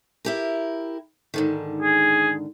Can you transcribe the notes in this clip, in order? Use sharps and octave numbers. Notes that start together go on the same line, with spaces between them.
E4 G4 A#4
G#2 D3 D#3
G#4